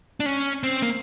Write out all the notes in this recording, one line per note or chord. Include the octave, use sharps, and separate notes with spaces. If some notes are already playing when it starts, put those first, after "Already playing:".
D4
C#4
C4
A#3